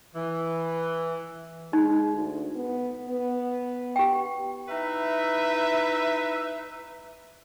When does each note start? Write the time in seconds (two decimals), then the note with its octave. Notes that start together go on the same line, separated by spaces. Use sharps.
0.16 E3
1.73 G#3 D#4
2.12 D2
2.56 B3
3.09 B3
3.96 G4 G5
4.69 D#4 E4 B4 E5